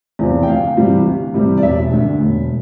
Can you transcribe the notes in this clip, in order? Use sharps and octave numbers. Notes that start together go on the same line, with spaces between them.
E2 C3 F3
G5
D2 F5
C3 E3 G3
D2
C3 E3 G3
D5
E1 E5
D2 D3
E1